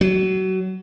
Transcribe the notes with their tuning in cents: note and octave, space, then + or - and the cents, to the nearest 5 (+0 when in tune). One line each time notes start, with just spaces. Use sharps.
F#3 +25